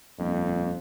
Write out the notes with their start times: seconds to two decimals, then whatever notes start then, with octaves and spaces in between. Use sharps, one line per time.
0.19 D#1 F2